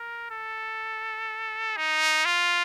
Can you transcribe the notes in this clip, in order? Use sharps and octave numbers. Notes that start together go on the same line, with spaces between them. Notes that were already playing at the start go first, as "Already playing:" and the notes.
Already playing: A#4
A4
D#4
F4